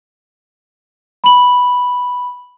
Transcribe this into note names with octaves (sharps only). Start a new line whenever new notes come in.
B5 F#7